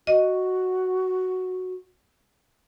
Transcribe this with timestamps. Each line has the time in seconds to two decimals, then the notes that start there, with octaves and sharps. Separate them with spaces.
0.07 F#4 D#5